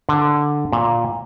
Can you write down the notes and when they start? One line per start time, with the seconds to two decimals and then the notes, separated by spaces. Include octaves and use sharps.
0.09 D3
0.72 A#2